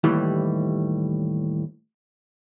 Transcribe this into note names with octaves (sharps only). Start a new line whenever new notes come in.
D#2 A2 E3 G3